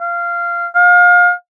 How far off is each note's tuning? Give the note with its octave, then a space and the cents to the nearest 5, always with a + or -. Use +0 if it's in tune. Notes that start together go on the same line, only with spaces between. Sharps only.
F5 -15
F5 +30